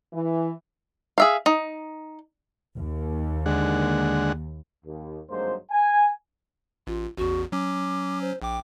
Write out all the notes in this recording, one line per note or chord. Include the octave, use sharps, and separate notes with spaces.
E3
G#4 E5 F5
D#4
D#2
D3 G#3 F#5
D#2
G#1 G2 F#3 G#3 A#3 C5
G#5
A1 F4
A1 E2 F#4
F#3 C#4 D6
C5
A#1 G5 D6